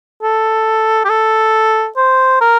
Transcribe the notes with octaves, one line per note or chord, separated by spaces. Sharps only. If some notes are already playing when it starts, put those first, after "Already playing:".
A4
G4
A4
C5
A#4